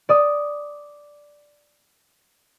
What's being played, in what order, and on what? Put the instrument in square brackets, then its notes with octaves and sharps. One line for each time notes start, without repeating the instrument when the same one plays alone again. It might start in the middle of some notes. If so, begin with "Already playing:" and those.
[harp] D5 D#6